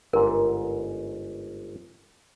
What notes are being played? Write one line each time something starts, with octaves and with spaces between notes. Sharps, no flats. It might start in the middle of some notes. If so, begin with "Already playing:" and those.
G1 G#2 A#4